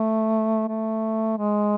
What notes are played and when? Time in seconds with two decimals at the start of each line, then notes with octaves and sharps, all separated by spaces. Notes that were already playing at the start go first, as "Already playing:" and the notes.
Already playing: A3
0.68 A3
1.37 G#3